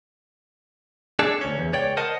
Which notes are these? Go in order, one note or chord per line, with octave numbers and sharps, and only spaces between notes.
D4 G#4 A4
D2 C#4
E2
C#2 C#5 D5 G5
A#4 C5 D#5 F#5 A5